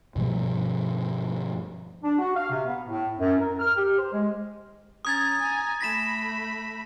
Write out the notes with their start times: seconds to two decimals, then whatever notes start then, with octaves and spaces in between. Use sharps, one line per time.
0.16 G2 B2 F3 G3
2.04 D4
2.19 F#4
2.36 F5
2.51 C3
2.66 B3
2.88 A2
3.20 F#2
3.39 A#4
3.60 F6
3.76 G4
3.98 C5
4.12 G#3
5.05 C#4 A#5 D#6 G#6 A6
5.41 G#5 A#5
5.81 A3 B5 A#6 B6 E7